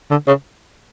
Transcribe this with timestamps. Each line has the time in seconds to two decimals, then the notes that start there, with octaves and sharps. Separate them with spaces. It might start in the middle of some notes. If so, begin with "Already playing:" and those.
0.11 D3
0.28 C#3